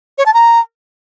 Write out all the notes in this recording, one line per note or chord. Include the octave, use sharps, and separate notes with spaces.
C#5
A5
A#5